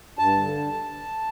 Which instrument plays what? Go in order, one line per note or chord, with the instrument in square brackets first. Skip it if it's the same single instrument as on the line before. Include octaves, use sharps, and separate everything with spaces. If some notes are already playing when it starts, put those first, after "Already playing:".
[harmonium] G2 A5
D3